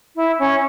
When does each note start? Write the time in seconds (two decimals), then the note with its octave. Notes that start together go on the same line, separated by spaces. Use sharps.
0.16 E4
0.39 C#4